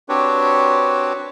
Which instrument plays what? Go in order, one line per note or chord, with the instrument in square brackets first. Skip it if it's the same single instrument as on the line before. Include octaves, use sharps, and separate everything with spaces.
[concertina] C4 D4 F#4 G4 B4 C#5